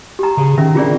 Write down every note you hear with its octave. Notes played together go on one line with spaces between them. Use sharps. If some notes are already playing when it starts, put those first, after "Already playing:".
G4 A#5
C#3 G#4
D#3 C#4 A#4 E5
D3 C4 F4 G#4 D5